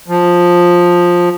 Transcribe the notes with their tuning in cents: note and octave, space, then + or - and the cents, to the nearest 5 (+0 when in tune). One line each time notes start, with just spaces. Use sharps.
F3 +10